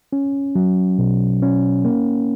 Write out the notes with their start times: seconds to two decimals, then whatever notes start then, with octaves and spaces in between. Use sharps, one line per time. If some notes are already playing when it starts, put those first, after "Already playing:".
0.13 C#4
0.55 F#3
0.98 B2
1.42 C#4
1.85 A#3